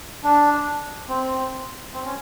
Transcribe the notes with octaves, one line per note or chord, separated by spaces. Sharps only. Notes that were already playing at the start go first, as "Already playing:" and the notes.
D4
C4
C4
C#4